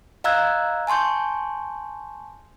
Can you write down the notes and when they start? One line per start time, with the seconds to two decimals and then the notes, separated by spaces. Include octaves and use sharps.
0.24 D#5 F5 A#5 E6 F#6 G#6
0.87 G#5 A5 C6 C#6 G6